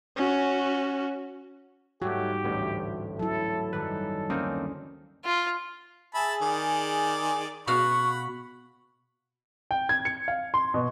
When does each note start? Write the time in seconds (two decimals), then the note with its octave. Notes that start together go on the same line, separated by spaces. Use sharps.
0.17 C#4 F#4
2.02 G#2 F#3 G3 A3 F#4 G4
2.45 A1 D2 A2
3.19 F#3 E4 A4
3.73 G#1 F#2 G3 A4 B4
4.30 D2 A#3 C4 C#4 D#4
5.24 F4
6.14 G#4 E5 A5 B5
6.42 D#3 D5
7.67 B2 F#4 F5 F#5 B5 C#6
9.71 G5
9.89 G#6
10.05 C#7
10.28 F5
10.54 C6
10.74 B2